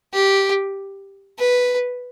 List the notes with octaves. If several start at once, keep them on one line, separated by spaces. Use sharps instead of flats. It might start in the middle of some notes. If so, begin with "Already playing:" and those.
G4
B4